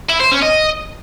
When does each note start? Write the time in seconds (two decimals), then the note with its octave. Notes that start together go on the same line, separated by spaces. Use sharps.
0.10 E4
0.21 C5
0.31 C#4
0.42 D#5